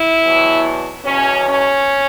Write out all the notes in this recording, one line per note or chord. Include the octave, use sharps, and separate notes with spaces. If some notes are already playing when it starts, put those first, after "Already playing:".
Already playing: E4
E2 B2 F#3
E2 B2 F#3 C#4
C#4